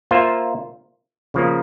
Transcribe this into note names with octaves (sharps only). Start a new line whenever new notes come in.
A#3 F4 C5 E5
C#3 F3 A#3